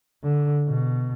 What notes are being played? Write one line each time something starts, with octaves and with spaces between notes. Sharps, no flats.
D3
B2